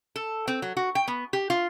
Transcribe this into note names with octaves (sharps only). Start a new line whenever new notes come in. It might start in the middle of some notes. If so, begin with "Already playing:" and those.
A4
C4
F#3
F#4
G5
B3
G4
F4